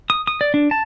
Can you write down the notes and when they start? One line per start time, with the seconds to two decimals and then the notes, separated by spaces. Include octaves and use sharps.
0.10 D#6
0.27 D#6
0.41 D5
0.54 D4
0.71 A5